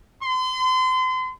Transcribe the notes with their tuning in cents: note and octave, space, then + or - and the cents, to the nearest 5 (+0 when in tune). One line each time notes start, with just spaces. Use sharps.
C6 -35